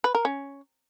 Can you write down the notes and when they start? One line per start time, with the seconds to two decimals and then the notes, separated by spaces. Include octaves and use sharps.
0.04 B4
0.15 A#4
0.25 C#4